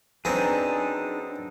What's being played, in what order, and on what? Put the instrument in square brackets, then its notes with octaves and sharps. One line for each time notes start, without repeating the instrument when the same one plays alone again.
[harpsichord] F#2 B3 C4 [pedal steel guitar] D4 D#4 G#4